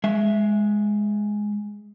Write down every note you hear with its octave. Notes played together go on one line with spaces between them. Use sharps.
G#3 E5